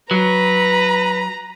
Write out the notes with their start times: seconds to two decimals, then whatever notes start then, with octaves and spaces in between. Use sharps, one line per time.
0.11 F#3 B4 A#5